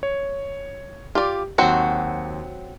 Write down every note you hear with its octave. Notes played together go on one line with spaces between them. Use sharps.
C#5
F4 G4 D5
D#2 F#3 C4 F#4 C#7